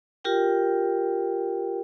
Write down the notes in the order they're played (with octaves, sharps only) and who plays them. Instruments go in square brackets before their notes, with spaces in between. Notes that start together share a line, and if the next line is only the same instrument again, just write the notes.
[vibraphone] F4 G4 A#4 G5